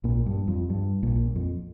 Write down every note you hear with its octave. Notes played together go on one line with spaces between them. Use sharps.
A#1 A#2
G2
F2
G2
A#1 A#2
F2